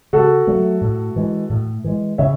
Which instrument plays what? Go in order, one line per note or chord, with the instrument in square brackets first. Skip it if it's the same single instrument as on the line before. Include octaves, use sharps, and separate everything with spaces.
[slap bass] C#3 [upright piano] F#4 A4
[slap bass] F#3 A3
A2
E3 G#3
A2
E3 G#3
[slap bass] C#3 [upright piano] C#5 E5